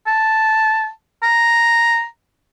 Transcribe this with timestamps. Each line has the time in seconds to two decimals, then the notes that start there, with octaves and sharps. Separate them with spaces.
0.07 A5
1.23 A#5